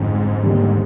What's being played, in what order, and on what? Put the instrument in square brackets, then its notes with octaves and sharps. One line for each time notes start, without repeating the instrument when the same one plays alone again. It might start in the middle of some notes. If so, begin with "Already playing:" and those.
Already playing: [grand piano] G1 F2 D3 [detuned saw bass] G#2
[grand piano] D#2 D3 G3